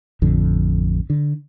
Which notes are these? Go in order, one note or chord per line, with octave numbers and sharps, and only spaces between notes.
A1 F2 D3
D3